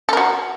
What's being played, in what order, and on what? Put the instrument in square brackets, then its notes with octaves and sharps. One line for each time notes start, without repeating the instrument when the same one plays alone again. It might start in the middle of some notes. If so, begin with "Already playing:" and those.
[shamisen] A4
A#4
F#4